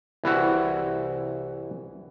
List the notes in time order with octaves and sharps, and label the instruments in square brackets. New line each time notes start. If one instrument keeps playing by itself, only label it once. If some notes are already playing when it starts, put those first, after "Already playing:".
[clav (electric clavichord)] C2 E3 E4 F#4